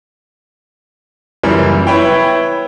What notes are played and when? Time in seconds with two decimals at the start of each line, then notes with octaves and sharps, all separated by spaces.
1.43 F#2 C#3 E3 G3 A#3 F4
1.87 B3 E4 B4 C#5 G5